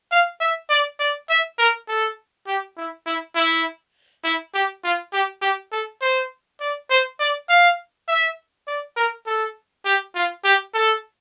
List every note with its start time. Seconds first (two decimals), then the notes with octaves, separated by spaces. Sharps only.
0.11 F5
0.40 E5
0.70 D5
0.99 D5
1.29 E5
1.59 A#4
1.88 A4
2.47 G4
2.77 E4
3.06 E4
3.36 E4
4.24 E4
4.54 G4
4.84 F4
5.13 G4
5.42 G4
5.72 A4
6.02 C5
6.60 D5
6.90 C5
7.20 D5
7.49 F5
8.08 E5
8.67 D5
8.97 A#4
9.27 A4
9.85 G4
10.15 F4
10.44 G4
10.74 A4